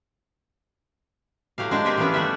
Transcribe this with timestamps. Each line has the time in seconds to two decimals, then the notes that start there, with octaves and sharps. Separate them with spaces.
1.58 A2 F#3 G4 F5
1.71 G#3 D4 G4 C5 A5
1.85 A#3 C4 G4 G#4 E5
1.97 E3 F#3 A#3 B3 C#4 D4
2.14 G3 A3 F#4 G4 C#5 E5